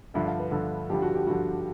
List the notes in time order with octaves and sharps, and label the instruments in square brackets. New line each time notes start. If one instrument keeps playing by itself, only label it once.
[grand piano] G2 D3 F3 [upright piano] E5
[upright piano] F5
B4
[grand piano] G2 D3 F3
[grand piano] G2 D3 F3 [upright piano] G4
[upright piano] F#4
G4
[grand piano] G2 D3 F3 [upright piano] F#4